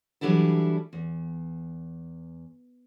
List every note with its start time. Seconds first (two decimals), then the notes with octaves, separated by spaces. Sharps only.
0.21 E3 F#3 G3 D4 E4 A4
0.93 E2